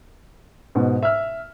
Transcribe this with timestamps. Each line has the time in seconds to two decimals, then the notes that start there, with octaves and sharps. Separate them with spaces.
0.75 G#2 B2
1.03 E5 F6